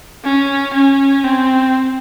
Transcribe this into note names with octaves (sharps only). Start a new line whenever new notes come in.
C#4
C#4
C4